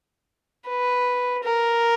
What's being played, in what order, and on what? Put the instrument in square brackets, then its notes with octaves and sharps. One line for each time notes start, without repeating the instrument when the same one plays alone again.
[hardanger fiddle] B4
A#4